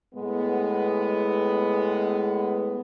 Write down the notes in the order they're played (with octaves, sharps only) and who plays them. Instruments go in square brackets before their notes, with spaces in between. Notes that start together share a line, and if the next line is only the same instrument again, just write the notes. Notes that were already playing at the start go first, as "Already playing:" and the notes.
[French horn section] A2 G#3 B3